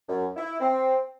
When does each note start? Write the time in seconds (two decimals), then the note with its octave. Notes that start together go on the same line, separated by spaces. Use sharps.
0.08 F#2
0.36 E4
0.60 C4